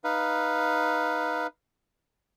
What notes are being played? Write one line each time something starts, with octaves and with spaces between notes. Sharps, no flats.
D#4 B4 F5